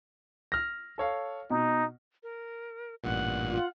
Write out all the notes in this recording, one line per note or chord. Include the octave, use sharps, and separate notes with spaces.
F6 A#6
A4 C#5 F5
B2 D#4
A#4
A1 G2 A#2 F#5
F4